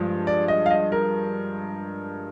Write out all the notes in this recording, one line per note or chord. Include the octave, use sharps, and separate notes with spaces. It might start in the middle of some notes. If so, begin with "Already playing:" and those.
Already playing: G2 F3 G#3
D5
D#5
F5
D#5
A#4